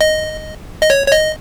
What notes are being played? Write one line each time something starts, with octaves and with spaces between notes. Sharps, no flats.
D#5
D#5
C#5
C#5
D#5